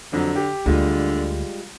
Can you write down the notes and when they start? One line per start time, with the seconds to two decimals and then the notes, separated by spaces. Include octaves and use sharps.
0.13 F2 D3 F#3
0.35 G4
0.66 D2 D3 G3 G#3 F4